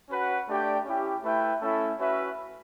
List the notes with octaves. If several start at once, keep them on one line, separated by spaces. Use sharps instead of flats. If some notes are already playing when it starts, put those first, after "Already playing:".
C#4 F#4 B4 F#5
A3 D4 G4 D5 G5
C#4 E4 G4
A3 E4 B4 E5 G5
A3 C#4 E4 A4 E5
C#4 F#4 B4 E5